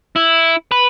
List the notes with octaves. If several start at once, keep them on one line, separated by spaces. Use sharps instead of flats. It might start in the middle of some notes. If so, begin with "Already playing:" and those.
E4
B4